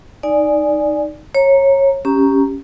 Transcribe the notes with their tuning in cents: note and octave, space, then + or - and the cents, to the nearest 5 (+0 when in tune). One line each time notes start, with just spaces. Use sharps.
D#4 +0 D5 +0 G#5 +0
C#5 -20 A#5 -5
C#4 +0 G4 +0 A#5 +0